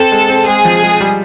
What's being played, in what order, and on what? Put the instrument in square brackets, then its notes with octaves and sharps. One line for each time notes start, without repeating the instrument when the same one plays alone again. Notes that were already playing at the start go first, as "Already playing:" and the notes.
Already playing: [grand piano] C4 [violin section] A4
[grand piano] G#3
C4
[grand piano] G#3 [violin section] G#4
[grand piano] F3
G#3
G3